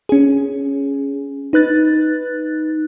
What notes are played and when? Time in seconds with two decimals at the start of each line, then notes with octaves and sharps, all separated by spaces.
0.09 C#4 G#4
1.53 D#4 B4 F#6 A6